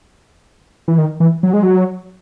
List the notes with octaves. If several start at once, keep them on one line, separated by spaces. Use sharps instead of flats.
E3
D#3
E3
F#3
G#3
F#3